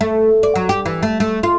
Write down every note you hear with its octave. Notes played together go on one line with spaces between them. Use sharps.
A3
D5
F#3
G4
E3
A3
A3
F4